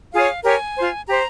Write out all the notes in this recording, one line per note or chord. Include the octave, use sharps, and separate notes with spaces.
F4 G#4 C#5 F5
G4 A#4 C#5 G#5
F4 C5
G4 C5 A#5